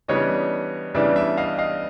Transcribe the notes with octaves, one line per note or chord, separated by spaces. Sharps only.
C#3 E3 G3 B3 D4 C#5 D#5
C#3 E3 G3 B3 D4 D5 E5
D5 E5
D#5 F5
D#5 F5